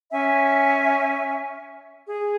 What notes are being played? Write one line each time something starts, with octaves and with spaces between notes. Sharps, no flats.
C#4 E5 G#5
G#4